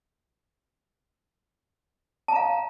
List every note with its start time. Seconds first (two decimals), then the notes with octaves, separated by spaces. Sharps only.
2.28 A5
2.32 A#5
2.36 F5